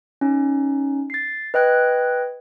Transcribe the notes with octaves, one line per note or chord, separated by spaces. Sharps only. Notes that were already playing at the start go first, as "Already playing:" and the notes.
C#4 D#4
A6 C7
B4 D#5 G5 F#6 G#6